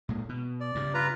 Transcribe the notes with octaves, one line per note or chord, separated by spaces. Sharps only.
A#2 G#3
B2
D5
G2 C#3
F4 B4 A#5